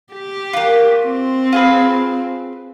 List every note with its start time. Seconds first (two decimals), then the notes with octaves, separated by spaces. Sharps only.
0.13 G4
0.53 A#3 F4 F#4
1.07 C4
1.52 F4 G#4 B4